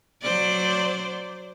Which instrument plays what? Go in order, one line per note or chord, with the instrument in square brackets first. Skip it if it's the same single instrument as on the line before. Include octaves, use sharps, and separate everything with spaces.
[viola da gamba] F#3 C5 D5